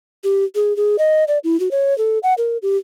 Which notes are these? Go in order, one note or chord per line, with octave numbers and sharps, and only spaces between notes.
G4
G#4
G#4
D#5
D5
E4
F#4
C#5
A4
F#5
A#4
G4